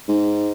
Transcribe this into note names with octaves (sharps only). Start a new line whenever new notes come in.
G#2